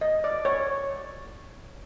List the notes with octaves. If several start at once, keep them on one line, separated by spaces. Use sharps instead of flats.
D#5
D5
C#5